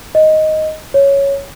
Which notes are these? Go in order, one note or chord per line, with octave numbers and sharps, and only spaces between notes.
D#5
C#5